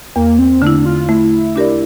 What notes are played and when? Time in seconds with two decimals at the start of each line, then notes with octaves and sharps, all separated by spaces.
0.16 E2 A#3
0.39 C4
0.62 D3 A3 D4 E4
0.86 F4
1.09 A3 E4
1.56 D4 G4 A#4 D5